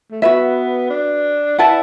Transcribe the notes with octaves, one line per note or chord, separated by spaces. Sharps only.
A3
B3 F#4 B4 E5
D4
E4 B4 D5 F#5 A5